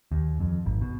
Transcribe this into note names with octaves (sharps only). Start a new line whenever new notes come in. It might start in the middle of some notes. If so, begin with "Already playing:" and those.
D#2
F2
G#1
B2